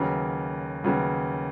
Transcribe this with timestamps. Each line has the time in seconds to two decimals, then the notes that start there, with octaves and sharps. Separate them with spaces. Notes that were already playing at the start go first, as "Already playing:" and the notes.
Already playing: D#2 C#3 F#3 B3
0.84 D#2 C#3 F#3 B3